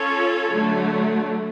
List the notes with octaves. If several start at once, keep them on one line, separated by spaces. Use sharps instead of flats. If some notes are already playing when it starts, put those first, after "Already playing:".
Already playing: C#4 F4 A4 C#5
D3 F#3 A3